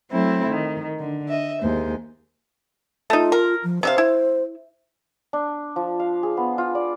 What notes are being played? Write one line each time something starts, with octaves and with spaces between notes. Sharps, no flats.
F#3 A3 C4 E4
D#3
D3
D#5 E5
D#2 G#3 C5
A3 D#4 F4
A#4
F3
C3 C5 E5 F5
E4
D4
F3
F5
G#4
B3
F4
D5